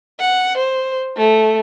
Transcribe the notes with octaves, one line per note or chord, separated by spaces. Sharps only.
F#5
C5
A3